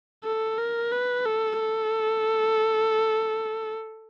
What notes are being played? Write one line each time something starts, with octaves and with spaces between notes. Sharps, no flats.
A4
A#4
B4
A4
A4